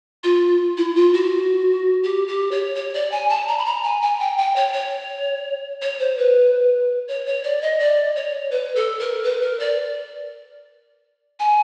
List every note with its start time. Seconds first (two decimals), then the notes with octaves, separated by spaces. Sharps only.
0.23 F4
0.77 E4
0.95 F4
1.14 F#4
2.03 G4
2.27 G4
2.51 C#5
2.75 C#5
2.94 D5
3.11 G#5
3.29 A5
3.48 A#5
3.58 B5
3.65 A#5
3.83 G#5
4.02 G#5
4.20 G5
4.38 G5
4.56 C#5
4.73 C#5
5.81 C#5
5.99 C5
6.17 B4
7.08 C#5
7.26 C#5
7.43 D5
7.62 D#5
7.79 D5
8.16 C#5
8.51 B4
8.76 A4
8.99 A#4
9.24 B4
9.41 A#4
9.59 D5
11.39 G#5